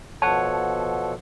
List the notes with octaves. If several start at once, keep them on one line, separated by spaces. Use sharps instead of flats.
B2 F3 A4 C#5 F#5 A5